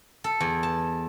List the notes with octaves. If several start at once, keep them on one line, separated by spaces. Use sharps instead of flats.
A4
E2
A5